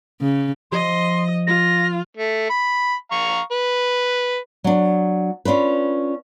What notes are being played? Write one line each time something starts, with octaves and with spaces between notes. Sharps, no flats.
C#3
F3 D#5 C6
F4 A#6
A3
B5
F5 A#5 C#6
B4
F#3 D4
C#4 D4 F4 B4